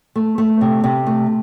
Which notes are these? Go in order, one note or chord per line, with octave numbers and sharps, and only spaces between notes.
A3
A3
C3
C3
A3